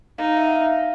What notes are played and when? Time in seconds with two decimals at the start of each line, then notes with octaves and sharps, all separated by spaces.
0.18 D#4 F5
0.37 E5
0.47 F#5
0.56 F5